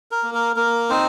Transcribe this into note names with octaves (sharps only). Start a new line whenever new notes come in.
A#4
A#3
A#4
A#3 A#4
C4 D#4 C5